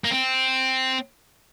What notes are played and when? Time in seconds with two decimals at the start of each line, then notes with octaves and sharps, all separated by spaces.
0.04 A#3
0.11 C4